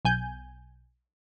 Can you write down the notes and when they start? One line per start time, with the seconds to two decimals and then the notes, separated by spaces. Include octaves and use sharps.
0.05 B1 G#5 G6